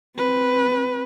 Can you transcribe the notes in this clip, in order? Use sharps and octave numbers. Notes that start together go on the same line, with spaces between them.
C4 B4